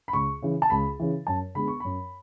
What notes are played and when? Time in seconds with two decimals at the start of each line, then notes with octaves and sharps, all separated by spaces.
0.08 B5
0.13 C#2 C#6
0.42 C#3 E3
0.62 A5
0.70 C#2 B5
1.00 C#3 E3
1.27 F#2 A5
1.55 D3 G#3 B3 B5
1.68 C#6
1.80 F#2 B5